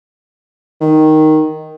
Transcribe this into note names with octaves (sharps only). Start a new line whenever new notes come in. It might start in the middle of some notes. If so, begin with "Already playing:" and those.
D#3